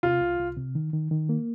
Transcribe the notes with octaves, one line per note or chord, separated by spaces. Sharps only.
C3 F4
C2
C2
C3
D#3
D#3
D#3
A#3